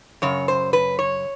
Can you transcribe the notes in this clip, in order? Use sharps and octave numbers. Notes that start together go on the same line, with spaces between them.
F#2 C#3 C#5
C5
B4
C#5